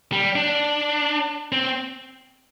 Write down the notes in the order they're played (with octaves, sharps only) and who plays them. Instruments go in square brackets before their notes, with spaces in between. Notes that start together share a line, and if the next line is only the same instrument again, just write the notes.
[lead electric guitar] G3
D4
C4